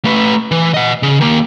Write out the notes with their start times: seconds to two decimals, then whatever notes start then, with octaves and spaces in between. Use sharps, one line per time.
0.05 A3 B4
0.51 E3
0.74 D#5 F#5
1.03 C#3
1.21 D#3 A#3